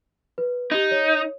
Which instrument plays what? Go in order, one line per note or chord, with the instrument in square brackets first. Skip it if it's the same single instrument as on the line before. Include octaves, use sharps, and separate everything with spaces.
[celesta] B4
[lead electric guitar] D#4 [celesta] G4 G#6
[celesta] C#5